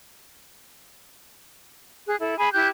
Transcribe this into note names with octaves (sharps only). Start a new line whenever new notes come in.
G#4 F#6
E4 A4
G#4 G#5 B5
E4 G4 F#6 G6